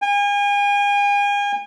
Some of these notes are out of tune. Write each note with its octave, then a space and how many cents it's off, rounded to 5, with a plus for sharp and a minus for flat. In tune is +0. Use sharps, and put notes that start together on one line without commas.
G#5 -40